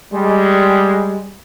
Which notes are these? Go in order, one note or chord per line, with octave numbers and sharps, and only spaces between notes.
G3 G#3